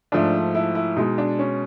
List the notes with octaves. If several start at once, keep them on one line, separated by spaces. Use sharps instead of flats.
G#2 F3 A3 D4
E4
E4
B2 G#3 D#4
D4
C#4